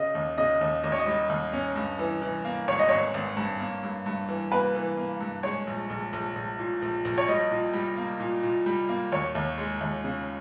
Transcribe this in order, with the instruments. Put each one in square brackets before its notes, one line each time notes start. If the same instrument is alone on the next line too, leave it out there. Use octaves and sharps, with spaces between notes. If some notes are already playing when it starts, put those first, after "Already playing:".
Already playing: [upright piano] C#3 [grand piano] D#5
[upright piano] D#2
[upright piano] C#3 [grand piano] D#5
[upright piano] D#2
[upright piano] D#2 [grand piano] D#5
[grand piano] C#5
D#5
[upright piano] G3
D#2
C#4
G2
E3
E3
A#3
[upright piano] G#1 [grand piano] C#5
[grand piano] D#5
[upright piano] G#1 [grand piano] C#5
[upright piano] G#1
G2
A#3
G2
G2
E3
[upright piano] A#3 [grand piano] B4
[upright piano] E3
A#3
G2
[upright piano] G#3 [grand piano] C#5
[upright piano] A#1
A#1
A#1
A#1
A#2
A#1
A#1
[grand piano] C#5
[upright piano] G3 [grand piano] D#5
[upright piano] A#2
G3
A#3
A#2
A#2
G3
A#3
[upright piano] D#2 [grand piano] C#5
[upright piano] D#2
G#3
D#2
C#3